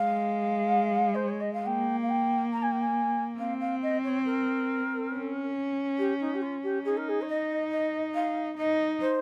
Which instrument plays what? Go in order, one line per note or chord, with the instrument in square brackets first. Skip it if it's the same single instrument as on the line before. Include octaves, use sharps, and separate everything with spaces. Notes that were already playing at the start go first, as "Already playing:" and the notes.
Already playing: [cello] G#3 [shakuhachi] F5
[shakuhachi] C5
C#5
D#5
F5
[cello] A#3 [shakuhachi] G5
[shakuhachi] F5
G5
A#5
G#5
G5
G#5
[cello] C4 [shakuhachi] F5
[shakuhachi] F5
D#5
C#5
A#4
[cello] C#4
[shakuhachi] G4
D#4
G4
F4
G4
[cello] D#4 [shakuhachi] G#4
[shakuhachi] A#4
G#4
C#5
D#5
D#5
F5
[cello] D#4 [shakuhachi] D#5
[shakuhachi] C5